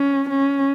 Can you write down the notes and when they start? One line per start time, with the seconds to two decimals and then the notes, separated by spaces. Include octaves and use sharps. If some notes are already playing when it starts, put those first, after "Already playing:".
Already playing: C#4
0.29 C#4